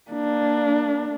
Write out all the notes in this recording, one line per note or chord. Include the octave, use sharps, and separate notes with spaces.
A#3 D4